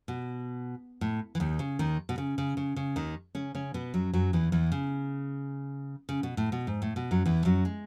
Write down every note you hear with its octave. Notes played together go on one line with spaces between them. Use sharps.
B2
A2
E3
D#2 D#3
C#3
D#2 D#3
B2
C#3
C#3
C#3
C#3
D#2 D#3
C#3 C#4
C#3 C#4
B2 B3
F#2 F#3
F#2 F#3
E2 E3
E2 E3
C#3
C#3
B2
A2
B2
G#2
A2
B2
F#2 F#3
E2 E3
F#2 F#3
G#3